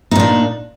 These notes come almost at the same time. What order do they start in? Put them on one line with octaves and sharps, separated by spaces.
D#4 A#2 D4